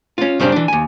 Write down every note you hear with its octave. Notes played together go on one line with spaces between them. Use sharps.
C#4 F4
G2 C#3 G3 C4 D4
E3 D4
D#2 G#5